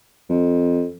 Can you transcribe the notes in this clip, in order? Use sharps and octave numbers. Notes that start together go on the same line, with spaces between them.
F2